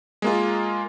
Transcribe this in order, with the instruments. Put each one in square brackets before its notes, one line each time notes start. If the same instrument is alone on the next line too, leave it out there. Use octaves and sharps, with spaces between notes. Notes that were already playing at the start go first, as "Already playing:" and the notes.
[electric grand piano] G#3 A#3 F4